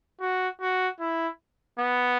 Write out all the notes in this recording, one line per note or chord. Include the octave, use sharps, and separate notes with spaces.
F#4
F#4
E4
B3